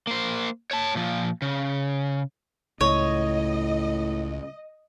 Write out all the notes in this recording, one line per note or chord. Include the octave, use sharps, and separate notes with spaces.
A#3 C5
C#5 A5
A#2 F3
C#3
C#2 A2 C#5 D#5